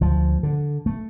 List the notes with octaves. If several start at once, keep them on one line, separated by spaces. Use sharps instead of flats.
D2 F3
D3
A3